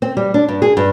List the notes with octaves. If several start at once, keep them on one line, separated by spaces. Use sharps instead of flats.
C4
G3
D4
G2
G#4
G2